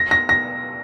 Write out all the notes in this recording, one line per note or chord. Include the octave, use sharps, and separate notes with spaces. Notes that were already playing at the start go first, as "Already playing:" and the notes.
Already playing: A#6
A#6
A#6